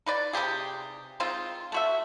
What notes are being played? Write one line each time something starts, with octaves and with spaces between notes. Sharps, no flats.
D#4 B4 D5
C3 F3 G4 G#4
G#3 C4 D#4 F4
A3 F#4 E5